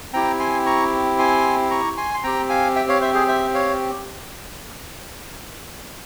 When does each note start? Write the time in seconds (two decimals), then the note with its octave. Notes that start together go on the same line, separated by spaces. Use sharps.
0.13 C4 E4 G4 G5 A#5
0.40 G#5 C6
0.66 A#5 C#6
1.19 G#5 C6
1.71 A#5 C#6
1.97 G#5 C6
2.14 C6
2.23 C4 G4 G5 A#5
2.49 F5 G#5
2.76 E5 G5
2.89 C#5 F5
3.01 C5 E5
3.14 G#4 C5
3.28 C5 E5
3.54 C#5 F5